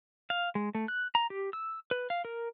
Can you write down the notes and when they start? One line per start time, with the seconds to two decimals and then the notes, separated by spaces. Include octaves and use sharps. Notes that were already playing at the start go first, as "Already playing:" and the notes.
0.30 F5
0.55 G#3
0.75 A3
0.88 F#6
1.15 A#5
1.30 G4
1.53 E6
1.91 B4
2.10 F5
2.25 A#4